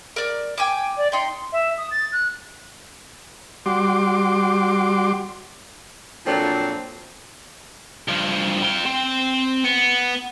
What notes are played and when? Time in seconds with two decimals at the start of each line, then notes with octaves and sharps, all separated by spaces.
0.16 A#4 D5
0.58 G5 G#5 D6
0.97 D5
1.12 D#4 G5 C6
1.52 E5
1.77 D#6
1.91 A6
2.12 F#6
3.66 G3 F#4 C6 D6
6.26 A#2 F3 F#3 C4 D4 A4
8.08 G2 F3
8.63 F4 G5
8.85 C4
9.64 B3